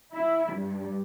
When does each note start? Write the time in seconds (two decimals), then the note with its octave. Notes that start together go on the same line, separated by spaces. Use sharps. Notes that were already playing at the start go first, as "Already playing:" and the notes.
0.13 E4
0.54 G2